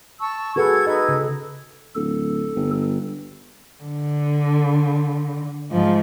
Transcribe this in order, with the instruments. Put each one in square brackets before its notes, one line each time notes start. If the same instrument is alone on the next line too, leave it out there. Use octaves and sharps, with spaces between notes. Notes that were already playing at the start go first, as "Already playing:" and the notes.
[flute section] A5 C#6 E6
[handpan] F#4 G#4 B4 [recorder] A4 [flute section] F#5 G#6
[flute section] D#4 B4 G#6 [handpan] D#5
[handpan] C#3
[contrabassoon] D1 [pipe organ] A4
[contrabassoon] G1
[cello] D3
G#2 F3